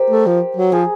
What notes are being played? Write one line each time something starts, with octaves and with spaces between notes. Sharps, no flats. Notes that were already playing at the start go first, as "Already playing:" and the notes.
Already playing: G4 A#4 C5
A3
F3
F#3
F3 G#4